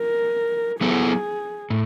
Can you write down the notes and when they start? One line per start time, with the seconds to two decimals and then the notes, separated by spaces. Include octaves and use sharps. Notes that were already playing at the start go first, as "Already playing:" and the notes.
Already playing: A#4
0.81 F#3 B3 E4 G#4 A4 C5
1.70 A2